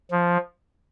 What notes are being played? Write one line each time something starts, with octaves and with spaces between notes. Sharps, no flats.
F3